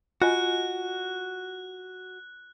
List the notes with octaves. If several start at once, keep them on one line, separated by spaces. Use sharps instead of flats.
F4 F#4 D#5 G#5 F#6